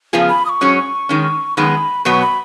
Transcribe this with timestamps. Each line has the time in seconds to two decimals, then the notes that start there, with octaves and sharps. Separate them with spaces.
0.13 C#3 F3 B3 F4 G#4
0.29 B5
0.45 D#6
0.49 C#6
0.61 G#2 F#3 C#4 G#4 C#5
1.09 D#3 G#3 C#4
1.57 F#2 D#3 G#3 B3 B5
2.05 B2 F#3 B3 F#4 B4 C#6
2.22 B5